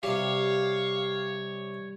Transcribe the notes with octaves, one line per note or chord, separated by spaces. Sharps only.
C3 G3 G4 C#5 F5